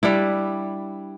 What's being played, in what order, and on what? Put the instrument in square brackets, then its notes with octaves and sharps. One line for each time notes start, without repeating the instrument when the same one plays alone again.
[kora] G3 D4 E4